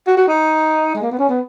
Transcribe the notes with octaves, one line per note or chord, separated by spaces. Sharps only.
F#4
F#4
D#4
G#3
A#3
B3
C#4
B3